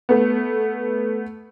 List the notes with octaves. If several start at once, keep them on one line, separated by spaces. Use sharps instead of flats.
A3 B3